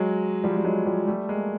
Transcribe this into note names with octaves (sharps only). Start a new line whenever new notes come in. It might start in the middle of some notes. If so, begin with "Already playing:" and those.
Already playing: F#3 G#3
F3 G3
G3
F#3 G#3
F3 G3
G3 A3
G#3 A#3